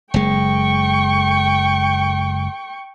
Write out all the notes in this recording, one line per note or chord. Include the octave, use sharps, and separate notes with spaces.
F#1 G#3 G5 C#6